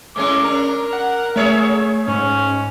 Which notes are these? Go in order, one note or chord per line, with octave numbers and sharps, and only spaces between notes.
A2 G#3 C#4 D6
D4 A#4
F#5
A3 G#4 C#5 E5
G#2 C#4